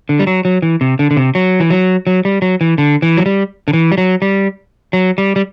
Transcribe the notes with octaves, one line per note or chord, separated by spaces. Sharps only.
D3
G3
F#3
F#3
E3
C3
D3
D3
C3
F#3
E3
F#3
F#3
G3
F#3
E3
D3
E3
F#3
G3
D3
E3
G3
F#3
G3
F#3
G3
G3